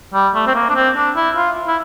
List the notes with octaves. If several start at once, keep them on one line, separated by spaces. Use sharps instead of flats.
G3
A3
C4
A#3
D4
C4
D4
E4
F4
E4